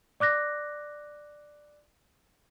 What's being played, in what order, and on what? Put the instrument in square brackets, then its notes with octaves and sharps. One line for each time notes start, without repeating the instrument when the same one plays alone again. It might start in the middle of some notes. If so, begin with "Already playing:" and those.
[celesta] D5 D6 F#6 A#6